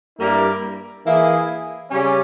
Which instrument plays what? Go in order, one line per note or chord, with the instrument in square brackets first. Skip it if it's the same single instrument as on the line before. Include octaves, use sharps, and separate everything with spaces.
[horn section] G2 G3 A#3 E4 A#4
E3 A#3 E4 G#4
C#3 G3 C#4